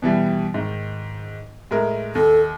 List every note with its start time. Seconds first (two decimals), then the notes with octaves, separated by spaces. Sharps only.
0.02 B2 E3 G3
0.54 G#2 D#3
1.71 A2 G#3 A#4
2.15 D#2 A4